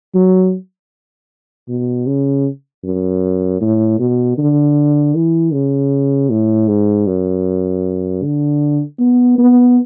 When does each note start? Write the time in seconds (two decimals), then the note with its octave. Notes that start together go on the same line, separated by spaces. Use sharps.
0.15 F#3
1.68 B2
2.07 C#3
2.84 F#2
3.61 A2
3.99 B2
4.38 D3
5.15 E3
5.53 C#3
6.30 A2
6.68 G#2
7.07 F#2
8.22 D3
8.99 B3
9.38 B3